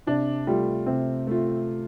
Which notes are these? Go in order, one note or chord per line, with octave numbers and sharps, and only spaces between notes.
C3 D4
G3 A3 F4
C3 C4
A3 F4